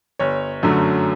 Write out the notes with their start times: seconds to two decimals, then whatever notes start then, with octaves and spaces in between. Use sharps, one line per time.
0.19 G1 C#5
0.63 F#2 D3 F#3 A3